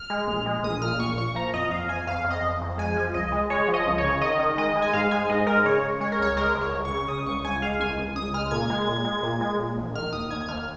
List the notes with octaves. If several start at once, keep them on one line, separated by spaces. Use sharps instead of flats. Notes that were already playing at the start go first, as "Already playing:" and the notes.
Already playing: F6
G#3
A#1
G#3
A#1 D#6
A#2 F6
A#1 C#6
A#2 C#6
F3 A#5
F2 D#5
F2 F5
F2 G#5
F2 F5
F2
D#5
F2
F2
G#3 G#5
F3
C#2 D#5
G#3
G#3 C#5
F3
D#5
C#2
C#5
C#3
D#3 D#5
D#3
G#3 D#5
G#3
G#5
G#2 F5
G#3 G#5
G#2 D#5
G#3 A#4
C#3 C#5
C#3
G#3 C#5
A#4
C#2 C#5
G#3 A#4
C#2
C#5
C#2
C#6
C#3
C#3 D#6
C#2 C#6
C#2 G#5
G#3 F5
C#2 G#5
C#2
C#2 D#6
G#3 F6
A#2 G#6
G#3
A#2
G#3
A#2
G#3
A#2
A#1
D#3 F6
D#2 D#6
D#2 G#6
G#6
D#2 F6